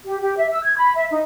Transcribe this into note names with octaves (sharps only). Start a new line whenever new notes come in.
G4
G4
E5
E6
G#6
B5
E5
D#4